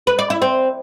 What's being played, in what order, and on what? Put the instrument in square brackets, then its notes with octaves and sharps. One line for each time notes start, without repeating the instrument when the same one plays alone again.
[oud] B4
D5
E4
C4